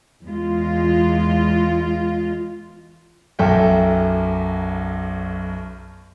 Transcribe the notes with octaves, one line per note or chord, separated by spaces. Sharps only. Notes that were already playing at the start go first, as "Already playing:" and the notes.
E2 G#3 F4
B1 F#2 A4 E5 G5